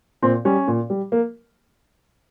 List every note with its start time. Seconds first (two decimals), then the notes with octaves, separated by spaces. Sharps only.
0.22 A#2 C4
0.45 G3 C#4
0.68 A#2
0.90 G3
1.12 A#3